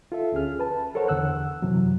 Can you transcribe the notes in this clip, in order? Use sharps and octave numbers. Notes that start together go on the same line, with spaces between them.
F4 A4 E5
D2 C#4 G#4 F6
B4 A5
A4 A#4 C5 C#5 F#5
E2 D3 F#5 E6 F#6
F#2 C3 E3 F#3